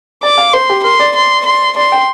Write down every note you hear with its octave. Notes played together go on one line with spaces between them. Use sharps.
D5 D6
F5
C5 C6
G4
A#4 C6
D5
C6
C6
D5 C6
G5